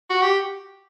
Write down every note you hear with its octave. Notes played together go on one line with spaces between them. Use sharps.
F#4
G4